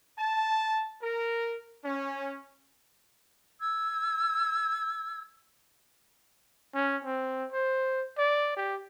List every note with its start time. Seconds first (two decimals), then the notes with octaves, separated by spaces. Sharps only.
0.19 A5
1.03 A#4
1.85 C#4
3.61 E6 G#6
6.75 C#4
7.04 C4
7.52 C5
8.18 D5
8.57 G4